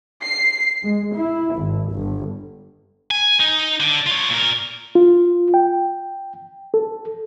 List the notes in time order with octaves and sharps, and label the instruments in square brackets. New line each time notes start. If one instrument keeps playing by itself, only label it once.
[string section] C7
G#3
E4
G#1
G1
[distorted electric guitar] G#5
D#4
D3
F4 C#5
A#2 A#4
[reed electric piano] F4
G5
A4